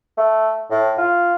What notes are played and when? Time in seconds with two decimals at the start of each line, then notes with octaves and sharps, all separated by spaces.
0.18 A3
0.71 A2
0.98 F4